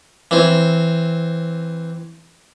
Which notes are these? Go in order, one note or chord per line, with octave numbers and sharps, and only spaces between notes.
E3 C4